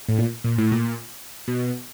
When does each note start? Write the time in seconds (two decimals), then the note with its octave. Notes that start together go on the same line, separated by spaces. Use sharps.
0.08 A2
0.18 A#2
0.44 A#2
0.58 A2
0.72 A#2
1.48 B2